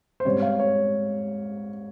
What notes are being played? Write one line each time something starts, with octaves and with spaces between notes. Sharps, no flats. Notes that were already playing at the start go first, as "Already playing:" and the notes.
C5
G#2 G3 C4 C#5
F5
C#5